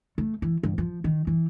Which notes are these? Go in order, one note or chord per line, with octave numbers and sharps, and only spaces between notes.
A3
E3
G2
F3
D#3
E3